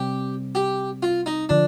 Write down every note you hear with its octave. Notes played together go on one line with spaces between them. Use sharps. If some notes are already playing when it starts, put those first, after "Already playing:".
Already playing: C3 G3 C4 G4
G4
F4
D#4
D3 F3 D4